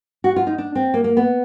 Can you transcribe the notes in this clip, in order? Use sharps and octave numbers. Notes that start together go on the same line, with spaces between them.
F#4
F4
D#4
D4
C4
A#3
A#3
B3